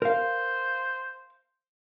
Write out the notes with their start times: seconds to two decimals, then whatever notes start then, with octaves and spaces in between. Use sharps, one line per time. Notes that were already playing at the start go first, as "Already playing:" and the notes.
0.02 A#4 C5 F5